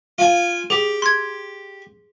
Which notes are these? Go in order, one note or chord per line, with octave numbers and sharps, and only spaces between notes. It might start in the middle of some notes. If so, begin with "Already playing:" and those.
F4 G#5
G4 G#4
C6 G#6